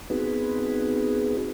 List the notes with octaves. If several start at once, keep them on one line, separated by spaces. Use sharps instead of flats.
B3 C4 D#4 F#4 G#4 B4